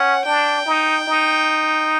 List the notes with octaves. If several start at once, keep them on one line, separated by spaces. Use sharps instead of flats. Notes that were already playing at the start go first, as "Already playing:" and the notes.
Already playing: C#4 F#5
D4 G5
D#4
D#4